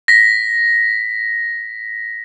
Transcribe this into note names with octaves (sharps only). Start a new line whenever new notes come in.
A#6 B6